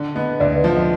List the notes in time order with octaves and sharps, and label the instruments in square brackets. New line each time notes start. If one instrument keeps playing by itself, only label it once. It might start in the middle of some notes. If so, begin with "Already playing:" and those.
Already playing: [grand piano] D3
[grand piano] B3 [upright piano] D#5
[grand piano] D2 [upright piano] D5
[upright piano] B4
[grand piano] F3
[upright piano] D#5